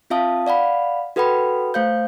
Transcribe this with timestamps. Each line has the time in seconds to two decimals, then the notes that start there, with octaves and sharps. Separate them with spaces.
0.10 C4 F4 E5 F5 A5 D#6
0.47 D5 F5 F#5 B5
1.16 F#4 A4 B4 F#5 G5 B5
1.74 A3 C5 F5 G6